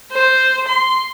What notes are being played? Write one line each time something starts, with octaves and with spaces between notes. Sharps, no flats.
C5
C6